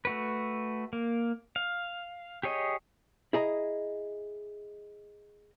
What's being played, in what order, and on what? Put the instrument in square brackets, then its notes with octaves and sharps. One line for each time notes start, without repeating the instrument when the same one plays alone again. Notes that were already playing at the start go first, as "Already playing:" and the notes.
[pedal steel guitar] A3 F#4 B4
A#3
F5
G4 G#4 C#5 D#5
[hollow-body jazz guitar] E4 G#4 D#5 A#5